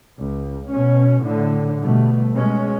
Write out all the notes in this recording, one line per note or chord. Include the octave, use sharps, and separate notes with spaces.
C#2
B2 C#4
A2 D3
G1 B2 A3
B2 G#3 C#4